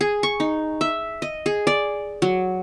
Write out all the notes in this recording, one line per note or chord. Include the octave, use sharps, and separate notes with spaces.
G#4
C#6
D#4
E5
D#5
G#4
D5
F#3